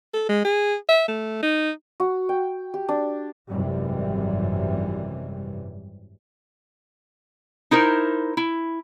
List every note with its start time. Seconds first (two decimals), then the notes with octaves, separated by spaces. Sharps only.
0.14 A4
0.29 G#3
0.45 G#4
0.89 E5
1.08 A3
1.43 D#4
2.00 F#4
2.29 G5
2.74 G4
2.89 D4
3.50 G#1 F#2 C3 E3 G3
7.71 D#4 E4 A#4 C5
8.37 E4